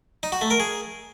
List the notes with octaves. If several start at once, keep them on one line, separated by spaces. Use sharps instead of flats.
D#4
F#4
A3
A#4
G#4